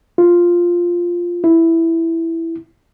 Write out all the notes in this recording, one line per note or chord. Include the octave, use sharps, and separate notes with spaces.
F4
E4